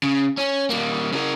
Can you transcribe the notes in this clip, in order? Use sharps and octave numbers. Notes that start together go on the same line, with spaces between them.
C#3
C#4
G3 A#3
C#3 A#4